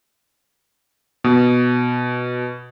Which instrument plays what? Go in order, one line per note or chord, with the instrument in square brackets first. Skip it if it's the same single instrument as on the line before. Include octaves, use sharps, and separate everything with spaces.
[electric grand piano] B2